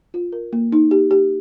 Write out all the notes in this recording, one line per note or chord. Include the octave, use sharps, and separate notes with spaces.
F4
A#4
A#3
D#4
G4
G4